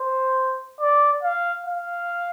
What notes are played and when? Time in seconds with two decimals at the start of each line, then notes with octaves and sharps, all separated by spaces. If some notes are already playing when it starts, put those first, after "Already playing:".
Already playing: C5
0.81 D5
1.23 F5
1.67 F5